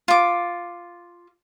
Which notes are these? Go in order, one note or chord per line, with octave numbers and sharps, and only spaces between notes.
F4 D6